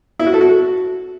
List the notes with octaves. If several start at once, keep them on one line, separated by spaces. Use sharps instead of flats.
E4
F#4
A4
F#4